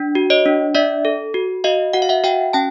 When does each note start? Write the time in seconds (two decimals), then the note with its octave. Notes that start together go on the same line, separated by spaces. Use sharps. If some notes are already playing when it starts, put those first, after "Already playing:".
Already playing: D4
0.15 F#4
0.30 C#5 D#5
0.46 D4
0.75 D4 D5 E5
1.05 A4
1.34 F#4
1.64 F#4 D#5 F5
1.93 F#4 F#5
2.02 F5
2.09 E5 F#5
2.24 F#4 F5 G5
2.53 C#4 G5 A5